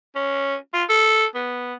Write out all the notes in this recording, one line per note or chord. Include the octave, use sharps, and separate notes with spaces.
C#4
F4
A4
B3